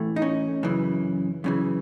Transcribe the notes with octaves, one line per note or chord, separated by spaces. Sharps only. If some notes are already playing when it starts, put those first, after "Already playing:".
Already playing: A2 E3 A3
D#4
C#4
F#2 C#3 E3
F#2 C#3 E3